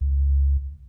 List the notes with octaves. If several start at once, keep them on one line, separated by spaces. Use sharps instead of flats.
C#2